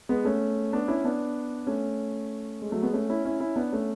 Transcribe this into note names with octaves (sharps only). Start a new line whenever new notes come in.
G#3 B3
A3 C#4
B3 D4
C#4 E4
B3 D4
A3 C#4
G#3
F#3 A3
G#3 B3
A3 C#4
C#4 E4
C#4 E4
C#4 E4
B3 D4
A3 C#4